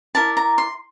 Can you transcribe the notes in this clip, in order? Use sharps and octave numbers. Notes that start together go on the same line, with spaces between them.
E4 A#4 D5 A5
A#5
C6